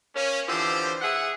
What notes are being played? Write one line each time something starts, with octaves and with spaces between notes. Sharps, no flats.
A#3 C#4
D3 E3 F3 G4 C5
G#4 E5 F#5